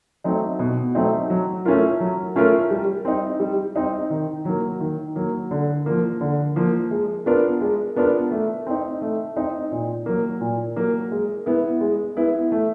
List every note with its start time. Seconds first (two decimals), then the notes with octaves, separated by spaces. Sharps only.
0.24 F#3 A3 C4 D#4
0.59 B2
0.95 F#3 A3 C4 D#4
1.30 F#3
1.65 A3 C#4 F4 A#4
2.00 F#3
2.36 A3 C#4 F4 A#4
2.71 G3
3.05 C4 D#4
3.40 G3
3.76 C4 D#4
4.10 D#3
4.45 F#3 A#3
4.80 D#3
5.16 F#3 A#3
5.51 D3
5.86 F3 A#3
6.21 D3
6.56 F3 A#3
6.91 G#3
7.26 B3 D4 F4 A#4
7.61 G#3
7.96 B3 D4 F4 A#4
8.31 A3
8.67 C4 D#4
9.01 A3
9.37 C4 D#4
9.72 A#2
10.06 F#3 A#3
10.41 A#2
10.76 F#3 A#3
11.12 G#3
11.46 B3 E4
11.81 G#3
12.17 B3 E4
12.52 A3